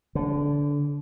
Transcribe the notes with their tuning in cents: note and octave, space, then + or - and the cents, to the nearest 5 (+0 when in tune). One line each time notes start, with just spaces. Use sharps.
D3 -25